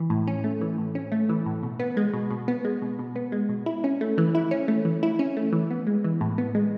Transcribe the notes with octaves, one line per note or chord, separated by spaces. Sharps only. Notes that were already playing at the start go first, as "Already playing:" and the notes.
Already playing: E3
A2
C#4
A3
E3
A2
C#4
A3
E3
A2
B2
B3
G#3
B2
B2
B3
G#3
B2
B2
B3
G#3
B2
E4
C#4
A3
E3
E4
C#4
A3
E3
E4
C#4
A3
E3
B3
G#3
E3
A2
B3
G#3